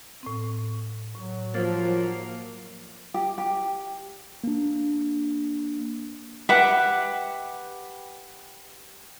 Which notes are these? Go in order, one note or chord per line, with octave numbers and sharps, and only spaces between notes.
A2 C4
A2 F#3
F3 A#3 A6
G4
G4
A#3 D4
G4 B4 E5 F#5